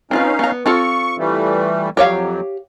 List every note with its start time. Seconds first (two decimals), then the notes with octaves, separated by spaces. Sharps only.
0.11 C4 C#4 D#4 F4 B4 F5
0.39 B3 A#5
0.66 C4 F4 A4 C#6
1.18 E3 G3 A3
1.97 F2 F#3 G4 C#5 F5